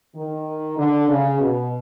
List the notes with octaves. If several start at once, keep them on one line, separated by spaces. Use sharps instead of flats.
D#3
D3
C#3
B2